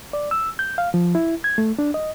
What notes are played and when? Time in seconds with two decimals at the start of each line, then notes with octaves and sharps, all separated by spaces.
0.13 D5
0.31 E6
0.59 G6
0.78 F5
0.94 F3
1.15 E4
1.44 G#6
1.58 A3
1.79 D4
1.94 D#5